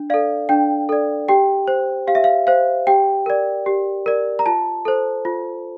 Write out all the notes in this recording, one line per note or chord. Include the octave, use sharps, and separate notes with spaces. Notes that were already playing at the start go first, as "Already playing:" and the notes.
Already playing: D4
A4 D5 F5
D4 G5
A4 D5
G4 G5
C5
G4 F5
E5
F5
C5 F5
G4 G5
A#4 D5
G4
A#4 D5
A#5
F4 A5
A4 C5
F4